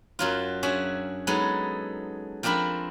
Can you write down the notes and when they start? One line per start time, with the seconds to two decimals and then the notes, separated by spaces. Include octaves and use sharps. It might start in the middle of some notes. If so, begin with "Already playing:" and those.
0.19 F#2 F#3 F4
0.63 C#4 D4 F#4 G#4 E5
1.27 F#3 G#3 B3 D#4 A4
2.43 F3 C4 D4 A#4 B5